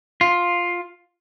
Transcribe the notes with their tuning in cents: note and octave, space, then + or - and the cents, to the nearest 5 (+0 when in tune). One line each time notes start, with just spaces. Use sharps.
F4 +5